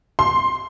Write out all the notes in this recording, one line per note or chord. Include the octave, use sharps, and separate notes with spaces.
C6